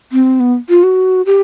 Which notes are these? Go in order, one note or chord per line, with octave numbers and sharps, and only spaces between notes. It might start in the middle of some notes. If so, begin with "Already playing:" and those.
C4
B3
F4
F#4
G4